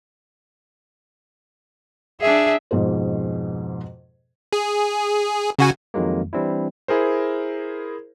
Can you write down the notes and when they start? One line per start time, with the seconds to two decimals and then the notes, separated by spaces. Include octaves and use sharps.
2.21 D4 G#4 E5
2.71 F2 G#2 B2 G#4 C5
4.53 G#4
5.59 C#3 F#4 G#5
5.94 F2 D#3 F#3 G#3 A#3
6.33 E3 G3 C4 D4 E4
6.88 E4 G#4 A#4 C5